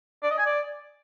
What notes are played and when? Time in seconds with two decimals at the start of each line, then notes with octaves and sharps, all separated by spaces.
0.23 D5
0.31 D#5
0.38 G#5
0.46 D5